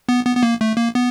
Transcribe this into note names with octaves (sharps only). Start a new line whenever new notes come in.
B3
B3
B3
A#3
A3
A#3
B3